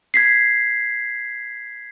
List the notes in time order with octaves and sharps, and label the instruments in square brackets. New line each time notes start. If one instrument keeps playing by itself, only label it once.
[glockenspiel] G#6 B6 C7